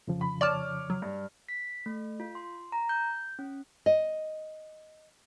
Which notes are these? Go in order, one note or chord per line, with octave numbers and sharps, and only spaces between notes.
F2 C#3 F3
B5
C#5 D5 A5 D6 F6
F#3
G2
B6
A3
F4
C6
A#5
G6
C#4
D#5